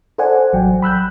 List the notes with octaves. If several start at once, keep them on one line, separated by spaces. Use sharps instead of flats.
A4 C5 D5 F#5 G#5
A1 F#3 G5
B5 E6 F#6 G6